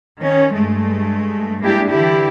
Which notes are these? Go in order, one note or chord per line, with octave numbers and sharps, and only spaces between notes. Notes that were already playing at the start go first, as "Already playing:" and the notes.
D#3 C#4
G2 G#3 A3
G#3 A#3 D4 E4 G4
D3 E3 E4 G4